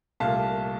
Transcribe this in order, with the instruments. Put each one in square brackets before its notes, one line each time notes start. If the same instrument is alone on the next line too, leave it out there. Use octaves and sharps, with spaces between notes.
[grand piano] C2 A#2 A3 F5 A5